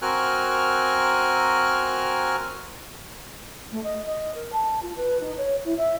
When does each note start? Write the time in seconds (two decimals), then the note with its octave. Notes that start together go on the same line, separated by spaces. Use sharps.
0.02 C4 F#4 A#4 G#5 F6 F#6
3.71 A3
3.83 D#5
4.06 D#5
4.34 A#4
4.52 A5
4.82 F4
4.96 B4
5.20 D#4
5.37 C#5
5.64 E4
5.77 E5